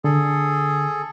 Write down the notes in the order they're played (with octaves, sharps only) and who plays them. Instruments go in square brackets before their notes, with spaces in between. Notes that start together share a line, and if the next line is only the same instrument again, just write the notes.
[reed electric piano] D3 [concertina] G#4 A4